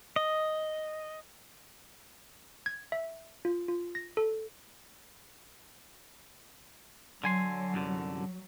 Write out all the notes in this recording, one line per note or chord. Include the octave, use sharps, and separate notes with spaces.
D#5
G#6
E5
F4
F4
A#6
A4
D3 F#3 G#5 C6
C2 F#2 D3